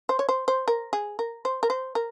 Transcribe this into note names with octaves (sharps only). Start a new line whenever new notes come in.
C5
C#5
C5
C5
A#4
G#4
A#4
C5
A#4
C5
A#4